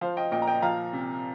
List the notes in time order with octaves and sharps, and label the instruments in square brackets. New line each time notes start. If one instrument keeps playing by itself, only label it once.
[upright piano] F3 C5 F5
D#5 G5
A#2 D#5 G5
A#5
D#5 G5
F3 F5 A#5
C3